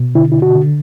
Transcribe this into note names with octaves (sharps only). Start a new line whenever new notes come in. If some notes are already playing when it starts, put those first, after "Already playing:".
Already playing: B2
D3 E4
E4
F#4
D3